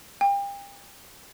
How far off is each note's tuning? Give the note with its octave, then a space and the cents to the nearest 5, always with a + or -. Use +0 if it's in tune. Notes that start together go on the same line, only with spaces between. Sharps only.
G5 +35